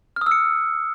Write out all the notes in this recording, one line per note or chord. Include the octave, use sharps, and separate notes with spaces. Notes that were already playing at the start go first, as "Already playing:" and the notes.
F6
D#6
E6
C#7